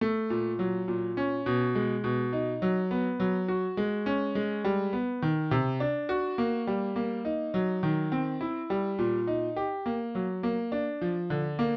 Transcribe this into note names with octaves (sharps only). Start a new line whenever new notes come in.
A3
A#2
F#3
A#2
C#4
B2
G#3
B2
D#4
F#3
B3
F#3
F#4
G#3
C#4
G#3
G3
B3
D#3
C3
D4
F#4
A#3
G3
A#3
D#4
F#3
D#3
C4
E4
G3
A#2
D#4
G4
A#3
F#3
A#3
D4
F3
D3
A#3